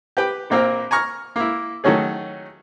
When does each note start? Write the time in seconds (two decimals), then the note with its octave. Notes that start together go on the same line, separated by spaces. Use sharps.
0.17 G4 B4 G5
0.50 A#1 A#2 A#3 C4 A#4
0.91 G#5 A#5 C#6 F6
1.36 A#3 E4
1.84 D#3 F#3 A3 C#4 G#4